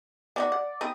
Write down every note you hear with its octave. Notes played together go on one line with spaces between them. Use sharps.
B3 D#4 F#4 D5
F#5
B3 C4 D#4 D#6